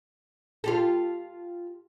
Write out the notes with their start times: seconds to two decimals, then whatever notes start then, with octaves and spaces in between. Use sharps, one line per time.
0.64 F4 G4 A4